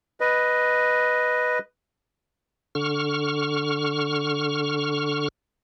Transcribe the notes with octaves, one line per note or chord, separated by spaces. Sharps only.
B4 D#5
D3 C#6 F6